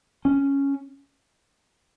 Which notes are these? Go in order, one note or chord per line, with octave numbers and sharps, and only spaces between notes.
C#4